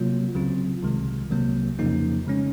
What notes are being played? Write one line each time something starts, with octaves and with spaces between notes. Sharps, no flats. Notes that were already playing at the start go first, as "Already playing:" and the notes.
Already playing: C3 F#3 A#3 F4
C#2 C#3 F#3 C4 F4
C2 C3 D#3 G#3
C2 C3 F#3 A#3
F2 C#3 F3 A#3 D#4
C#3 G#3 C#4